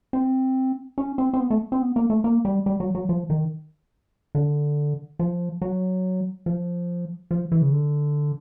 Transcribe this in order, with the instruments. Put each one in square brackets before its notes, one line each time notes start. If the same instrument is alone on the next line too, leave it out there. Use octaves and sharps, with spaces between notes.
[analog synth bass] C4
C#4
C4
C4
B3
A3
C4
B3
A#3
A3
A#3
G3
G3
F#3
F#3
F3
D#3
D3
F3
F#3
F3
F3
E3
C#3
D3